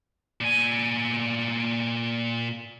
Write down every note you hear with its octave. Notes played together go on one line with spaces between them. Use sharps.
A#2 G#5